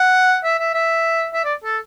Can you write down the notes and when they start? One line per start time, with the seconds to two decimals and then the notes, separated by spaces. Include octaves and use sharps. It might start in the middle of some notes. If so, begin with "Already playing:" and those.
Already playing: F#5
0.44 E5
0.59 E5
0.74 E5
1.34 E5
1.45 D5
1.64 A4